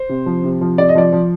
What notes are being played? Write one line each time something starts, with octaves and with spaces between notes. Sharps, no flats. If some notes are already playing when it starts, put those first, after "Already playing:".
Already playing: C5
C3
F3
C3
F3
C3 D5
D#5
F3 D5
F3